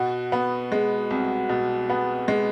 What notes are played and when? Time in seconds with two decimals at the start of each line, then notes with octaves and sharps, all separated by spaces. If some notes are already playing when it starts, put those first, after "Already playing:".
Already playing: B2 F#4
0.32 B3
0.72 G#3
1.11 C2
1.49 B2
1.89 B3
2.28 G#3